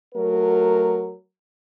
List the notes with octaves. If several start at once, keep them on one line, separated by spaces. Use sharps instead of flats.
F#3 A3 F#4 A#4